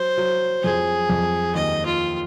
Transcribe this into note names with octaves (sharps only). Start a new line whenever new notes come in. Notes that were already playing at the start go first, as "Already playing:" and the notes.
Already playing: F#3 C5
F#3
F2 G#4
F2
D#2 D#5
F4